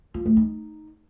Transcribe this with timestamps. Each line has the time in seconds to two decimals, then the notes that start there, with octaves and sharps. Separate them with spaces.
0.14 F4
0.25 A3
0.37 D#4